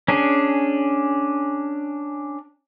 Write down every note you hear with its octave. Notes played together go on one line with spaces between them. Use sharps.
C#4 D4 G#4